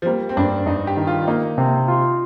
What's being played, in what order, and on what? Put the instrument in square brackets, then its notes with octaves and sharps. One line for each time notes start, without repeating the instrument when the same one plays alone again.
[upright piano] F3
[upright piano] G3 [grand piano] A#3
[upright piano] C4
[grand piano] G2 [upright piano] D4
[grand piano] G2 [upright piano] D#4
[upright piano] G4
[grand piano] D#3
[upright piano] F4
[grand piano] A#3 [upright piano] D#4
[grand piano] C3
F4